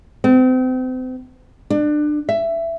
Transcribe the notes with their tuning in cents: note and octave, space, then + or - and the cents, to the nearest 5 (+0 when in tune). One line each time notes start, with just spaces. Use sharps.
C4 -35
D4 +25
E5 +15